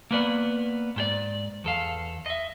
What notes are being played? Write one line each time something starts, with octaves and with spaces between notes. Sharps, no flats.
A#3 B3 D5
G#2 G4 D5
E2 A4 F5
D#5 E5